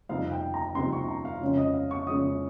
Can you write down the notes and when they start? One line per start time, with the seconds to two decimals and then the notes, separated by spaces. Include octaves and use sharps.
0.09 F2 C3 G3 C4 D#4 F5
0.32 G5
0.54 A#5
0.75 F2 C3 G3 C4 D#4 C6
0.92 C#6
1.09 A#5
1.25 F5
1.41 F2 C#3 G#3 C#4
1.58 D#5
1.74 F5
1.91 C#6
2.07 F2 C#3 G#3 C#4 D#6